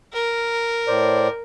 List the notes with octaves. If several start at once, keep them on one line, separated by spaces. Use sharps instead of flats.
A#4
A2 C5 D5